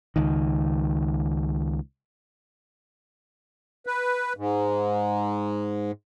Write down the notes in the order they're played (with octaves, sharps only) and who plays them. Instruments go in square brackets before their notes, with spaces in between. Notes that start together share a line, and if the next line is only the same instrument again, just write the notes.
[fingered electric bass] C#2 D#3
[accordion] B4
G#2